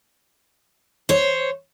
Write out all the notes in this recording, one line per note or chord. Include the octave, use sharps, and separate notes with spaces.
C5 C#5